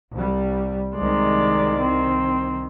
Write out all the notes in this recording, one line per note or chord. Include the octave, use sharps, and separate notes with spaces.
C2 G3
C2 D#3 G#3 D5
C4